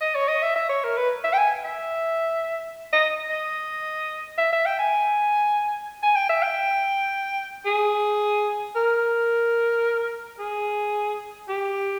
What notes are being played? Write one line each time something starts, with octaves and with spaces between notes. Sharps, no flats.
D#5
C#5
D#5
E5
E5
C#5
A#4
B4
E5
G5
G#5
E5
D#5
D#5
E5
E5
G5
G#5
G#5
G5
E5
G5
G#4
A#4
G#4
G4